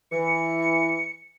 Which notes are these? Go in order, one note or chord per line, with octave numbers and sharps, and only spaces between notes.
E3 C#7